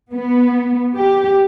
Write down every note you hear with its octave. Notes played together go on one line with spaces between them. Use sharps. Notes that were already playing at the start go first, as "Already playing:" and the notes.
B3
G4